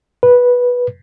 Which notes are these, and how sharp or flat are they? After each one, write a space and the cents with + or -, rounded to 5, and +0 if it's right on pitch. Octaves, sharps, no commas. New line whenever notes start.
B4 -10